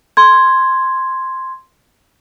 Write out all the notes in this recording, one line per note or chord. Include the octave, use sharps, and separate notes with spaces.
C6 G#6